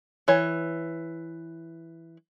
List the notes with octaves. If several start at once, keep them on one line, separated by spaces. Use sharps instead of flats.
E3 C#5